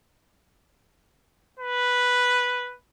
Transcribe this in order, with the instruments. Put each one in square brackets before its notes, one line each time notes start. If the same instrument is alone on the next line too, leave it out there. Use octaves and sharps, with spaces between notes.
[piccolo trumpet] B4